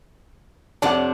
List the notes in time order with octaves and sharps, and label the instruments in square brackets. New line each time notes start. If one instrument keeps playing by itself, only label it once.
[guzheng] F2 C3 D5 [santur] D4 F#5